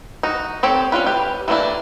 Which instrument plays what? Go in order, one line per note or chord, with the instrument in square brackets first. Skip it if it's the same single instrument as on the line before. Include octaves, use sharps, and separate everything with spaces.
[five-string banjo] D#4 F#4
C4 G4 A4 C#5
C#4 D4 F4 B4
G4 B4
E3 A3 A#3 D4 E4